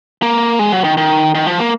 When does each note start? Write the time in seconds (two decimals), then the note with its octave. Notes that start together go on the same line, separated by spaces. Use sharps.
0.22 A#3
0.59 G#3
0.72 F#3
0.84 D#3
0.97 D#3
1.35 D#3
1.47 F3
1.59 A#3